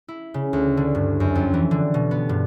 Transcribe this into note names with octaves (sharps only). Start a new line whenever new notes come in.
E4
C#3
D2
D3
G2
F#2
F2
E3
D3
B2
B3
G2